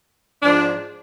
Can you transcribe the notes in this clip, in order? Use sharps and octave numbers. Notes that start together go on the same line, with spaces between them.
G#2 F3 D4